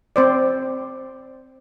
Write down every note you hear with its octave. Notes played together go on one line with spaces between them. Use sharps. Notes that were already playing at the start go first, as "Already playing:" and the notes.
C4 C5 D5